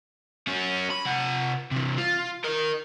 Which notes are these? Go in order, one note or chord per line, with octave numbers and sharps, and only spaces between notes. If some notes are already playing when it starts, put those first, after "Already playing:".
C#4 F#4
B5
C3 F#5
C3 E3
F4
A#4 D#5